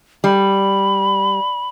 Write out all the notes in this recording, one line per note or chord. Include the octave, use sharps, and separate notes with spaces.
G3 B5